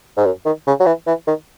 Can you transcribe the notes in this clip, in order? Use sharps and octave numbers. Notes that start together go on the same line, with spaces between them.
G#2
F#2
D#3
C#3
F#3
E3
E3
D#3